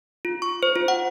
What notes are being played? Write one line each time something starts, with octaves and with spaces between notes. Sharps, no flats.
F4
C#6
C5
F4
F#5